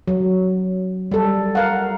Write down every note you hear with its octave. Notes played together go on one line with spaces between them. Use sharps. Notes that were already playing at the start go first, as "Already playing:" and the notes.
F#3
G3 A4
A#4 F5 F#5